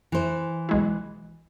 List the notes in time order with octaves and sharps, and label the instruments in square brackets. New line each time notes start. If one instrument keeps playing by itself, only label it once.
[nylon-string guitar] E3 C5
[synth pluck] B1 G#3 E4